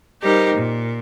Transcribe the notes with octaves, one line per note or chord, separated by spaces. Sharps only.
G3 D#4 G4 A#4 C5
A#2